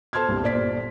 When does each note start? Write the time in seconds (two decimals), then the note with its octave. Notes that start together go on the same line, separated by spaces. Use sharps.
0.13 A4 C5 A5 C6 F6 G#6
0.28 C2 G2 A#2
0.42 G1 A#2 C5 D5 B6